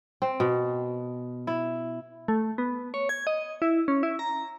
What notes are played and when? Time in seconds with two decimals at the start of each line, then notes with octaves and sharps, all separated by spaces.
0.22 C4
0.40 B2
1.47 E4
2.28 A3
2.58 B3
2.94 C#5
3.09 G#6
3.27 D#5
3.62 E4
3.88 C#4
4.03 E4
4.19 A#5